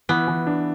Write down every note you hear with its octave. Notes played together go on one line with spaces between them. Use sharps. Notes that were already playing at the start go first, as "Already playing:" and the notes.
E3 B3
E3
D4